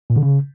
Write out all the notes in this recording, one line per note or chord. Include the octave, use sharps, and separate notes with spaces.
A#2
D3
C#3